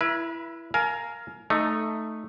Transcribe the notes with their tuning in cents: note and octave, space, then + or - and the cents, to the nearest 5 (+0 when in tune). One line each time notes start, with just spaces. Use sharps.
E4 +10 B4 -35
A#4 +0 F5 +0 G#5 +30
A3 +0 D#4 -10